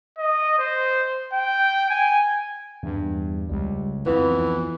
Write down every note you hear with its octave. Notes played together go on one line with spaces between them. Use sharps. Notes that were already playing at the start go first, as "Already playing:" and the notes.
D#5
C5
G5
G#5
E2 G2
C#2 G3
F2 E3 B3 F4 B4